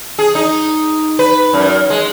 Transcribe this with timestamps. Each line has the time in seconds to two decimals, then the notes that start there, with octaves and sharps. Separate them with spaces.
0.19 G#4
0.35 D#4
1.19 B4
1.53 F#2
1.90 G#3